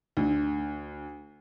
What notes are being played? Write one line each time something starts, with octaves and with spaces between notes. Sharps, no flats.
D2